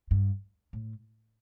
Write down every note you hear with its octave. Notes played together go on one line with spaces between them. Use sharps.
G2
A2